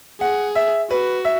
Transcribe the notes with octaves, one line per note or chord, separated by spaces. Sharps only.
G#4 F#5
E5
F#4 B4
E5